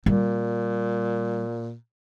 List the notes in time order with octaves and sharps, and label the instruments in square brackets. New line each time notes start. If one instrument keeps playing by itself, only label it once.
[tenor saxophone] A#2 [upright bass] G3